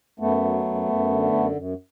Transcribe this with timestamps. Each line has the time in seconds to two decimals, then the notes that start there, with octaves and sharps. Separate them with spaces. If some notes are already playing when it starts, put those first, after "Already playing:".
0.20 F#2 A3 B3
0.42 F#3
0.65 F#2
0.88 F#2
1.10 D3
1.33 F#2
1.56 F#2